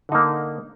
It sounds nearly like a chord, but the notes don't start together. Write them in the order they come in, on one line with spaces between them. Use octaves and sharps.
D3 D#4 A#3